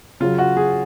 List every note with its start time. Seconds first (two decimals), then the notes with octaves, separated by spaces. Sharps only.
0.20 C#3 F#3 F4
0.38 F#4
0.57 G#4